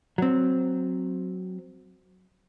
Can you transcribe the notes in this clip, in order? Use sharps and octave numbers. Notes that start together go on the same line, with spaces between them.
F#3 C4